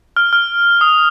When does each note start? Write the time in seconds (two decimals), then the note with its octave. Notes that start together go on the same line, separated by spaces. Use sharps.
0.17 F6
0.33 F6
0.81 D#6